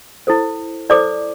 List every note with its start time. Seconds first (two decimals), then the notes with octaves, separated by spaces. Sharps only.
0.27 E4 A4 C5
0.90 E4 A4 C5 D5 D6